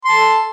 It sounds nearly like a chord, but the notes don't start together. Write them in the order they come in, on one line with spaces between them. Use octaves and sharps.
C6 A5 A4